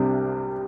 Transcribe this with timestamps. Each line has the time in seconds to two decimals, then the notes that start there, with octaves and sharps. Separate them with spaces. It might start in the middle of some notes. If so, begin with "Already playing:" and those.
Already playing: C2 C3 G3 D4